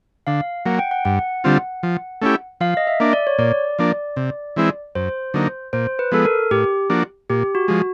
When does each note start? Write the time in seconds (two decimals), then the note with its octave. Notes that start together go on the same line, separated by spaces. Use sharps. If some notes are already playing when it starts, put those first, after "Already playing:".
0.27 D3 F5
0.65 F#3 A#3 F#5
0.79 G5
0.91 F#5
1.05 G2 F#5
1.44 D3 G3 C4 F4
1.83 F3
2.21 A3 C#4 E4 G4
2.61 F3 F5
2.77 D#5
2.87 E5
3.00 A#3 D4
3.13 D5
3.27 C#5
3.38 A#2 D5
3.79 F3 A#3 D4
4.16 C3
4.56 E3 G#3 C4 E4
4.95 F#2 C5
5.34 D3 F#3 A#3 D#4
5.73 A#2 C5
5.99 B4
6.11 F3 G#3 B3 A4
6.25 A#4
6.51 A2 G4
6.90 F3 A#3 D4 F#4
7.30 A#2 G4
7.55 F#4
7.68 F3 G#3